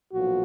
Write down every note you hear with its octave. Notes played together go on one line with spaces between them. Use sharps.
B1 A#2 F3 F#4